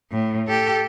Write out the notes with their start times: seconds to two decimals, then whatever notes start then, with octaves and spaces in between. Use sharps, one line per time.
0.12 A2
0.47 G4 A4